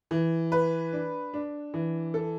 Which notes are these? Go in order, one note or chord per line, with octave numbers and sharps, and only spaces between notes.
E3
B4
D4
D4
E3
A4